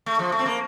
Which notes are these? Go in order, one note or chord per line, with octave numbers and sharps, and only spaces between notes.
A3
F3
A3
C4
A#3